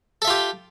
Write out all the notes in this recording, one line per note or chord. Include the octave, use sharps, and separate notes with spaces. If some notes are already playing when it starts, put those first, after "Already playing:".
F4 G4 A4 E5